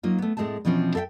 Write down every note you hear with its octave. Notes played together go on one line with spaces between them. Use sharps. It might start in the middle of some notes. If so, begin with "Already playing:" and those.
F#3 A#3 D#4 F4
A3 B3
A2 G#3 A3 C4 A5
B2 E3 F3 C4 C#4
A4 E5 F5 G5